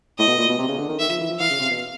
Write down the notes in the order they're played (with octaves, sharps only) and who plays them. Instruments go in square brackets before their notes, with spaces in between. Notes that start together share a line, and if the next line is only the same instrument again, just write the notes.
[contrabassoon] A2 [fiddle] D#5
[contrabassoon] B2
A#2
B2
C3
C#3
D3
D#3
[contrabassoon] D#3 [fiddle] E5
[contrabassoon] F3
E3
F3
[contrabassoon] E3 [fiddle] F5
[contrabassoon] C#3
C3
B2